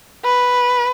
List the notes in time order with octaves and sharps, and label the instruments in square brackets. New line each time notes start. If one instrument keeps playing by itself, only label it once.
[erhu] B4